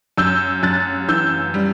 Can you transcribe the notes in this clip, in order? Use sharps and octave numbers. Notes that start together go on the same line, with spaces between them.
F#2 E6 G6
F#2 F#6 A6
E3 E6 G6
G3